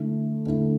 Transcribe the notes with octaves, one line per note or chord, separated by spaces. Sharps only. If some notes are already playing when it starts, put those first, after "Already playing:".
Already playing: D3 A3 E4
D3 A3 E4